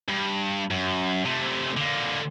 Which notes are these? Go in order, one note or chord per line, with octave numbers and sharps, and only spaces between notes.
G2
F#2
C3 A3
D3 A#3